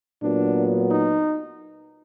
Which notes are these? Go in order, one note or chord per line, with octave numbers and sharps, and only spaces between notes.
A#2 F#3 B3 D4
D#4